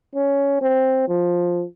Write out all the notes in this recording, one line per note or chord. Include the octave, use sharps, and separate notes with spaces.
C#4
C4
F3